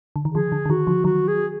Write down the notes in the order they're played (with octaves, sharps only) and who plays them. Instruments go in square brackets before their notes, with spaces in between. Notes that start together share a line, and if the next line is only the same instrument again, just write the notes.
[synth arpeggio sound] D3
D#3
[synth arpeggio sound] D3 F3 [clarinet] G#4
[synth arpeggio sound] D3
D3
[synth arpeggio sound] D#3 [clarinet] F#4
[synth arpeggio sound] D3 F3
[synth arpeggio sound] D#3 F#3 [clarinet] F#4
[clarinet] G#4